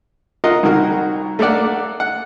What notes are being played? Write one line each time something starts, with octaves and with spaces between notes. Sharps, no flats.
F4 A#4 D#5 F#5
C2 D#3 F#4 A#4
A3 A#3 A4 D5 F#5
F#5